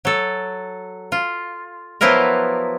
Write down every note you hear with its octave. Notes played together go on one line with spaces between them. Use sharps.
F#3 A4
F4
F3 F#3 B3 E4 F4 A#4